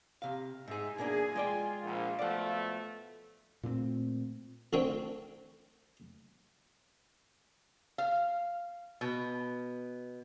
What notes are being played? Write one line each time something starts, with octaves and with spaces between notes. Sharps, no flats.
C3 F5
G#2 D#4 G#4 E5
B2 A#3 D4 G#4 G#5
G#3 F4 D5 G5
A#1 F5
B2 F3 A3 D5 F#5
A#2 A3 B3 C4
A1 D3 D#3 C4 C#5 G5
F5
B2